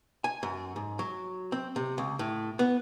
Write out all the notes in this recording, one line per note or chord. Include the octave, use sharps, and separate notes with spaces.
G#5
F#2
G#2
F#3
C4
C3
C#2
A2
B3